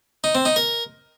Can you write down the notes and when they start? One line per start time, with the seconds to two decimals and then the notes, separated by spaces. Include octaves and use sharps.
0.24 D#4
0.35 C4
0.45 D#4
0.56 A#4